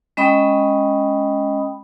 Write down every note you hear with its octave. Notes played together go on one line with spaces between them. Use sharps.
G#3 C#4 D#5 G5 B5 D#6